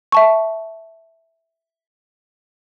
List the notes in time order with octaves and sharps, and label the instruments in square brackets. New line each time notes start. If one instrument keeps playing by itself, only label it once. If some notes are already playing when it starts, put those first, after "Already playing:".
[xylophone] E5 A5 C#6